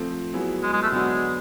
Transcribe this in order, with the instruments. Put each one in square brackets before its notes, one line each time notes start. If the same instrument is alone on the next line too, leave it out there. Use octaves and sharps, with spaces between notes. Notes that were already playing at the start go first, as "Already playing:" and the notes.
Already playing: [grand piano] F3 A3 C4
F#3 B3 E4 G#4
[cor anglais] G#3
G#3
A3
[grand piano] D3 F#3 B3 D4 F#4 [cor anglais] G#3